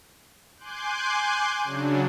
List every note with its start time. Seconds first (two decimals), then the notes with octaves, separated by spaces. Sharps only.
0.57 G#5 C6 D6 F#6 G6
1.64 C#3 F#3 D4